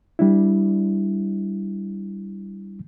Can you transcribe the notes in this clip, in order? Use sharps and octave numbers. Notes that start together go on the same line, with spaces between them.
G3 D4 E4